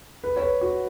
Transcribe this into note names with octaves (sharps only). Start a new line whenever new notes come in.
B4
C#5
B4
F#4